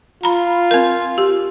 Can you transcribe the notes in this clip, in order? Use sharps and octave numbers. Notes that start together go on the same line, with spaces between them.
F4 A#5 B5
C4 A#4
G4